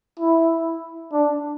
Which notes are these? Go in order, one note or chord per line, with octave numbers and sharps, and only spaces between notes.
E4
D4